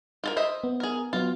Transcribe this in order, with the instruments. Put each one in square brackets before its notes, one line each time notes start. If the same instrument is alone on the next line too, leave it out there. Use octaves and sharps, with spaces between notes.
[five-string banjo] F4 A4 A#4
C5 D#5 E5
[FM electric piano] B3
[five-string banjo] G#4 A#4
[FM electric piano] F#3 B3 F6 [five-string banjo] F4